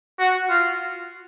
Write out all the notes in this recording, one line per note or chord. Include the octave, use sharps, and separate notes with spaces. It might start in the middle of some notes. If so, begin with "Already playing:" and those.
F#4
F4